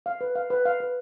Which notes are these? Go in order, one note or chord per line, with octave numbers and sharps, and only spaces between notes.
F5
B4
F5
B4
F5
B4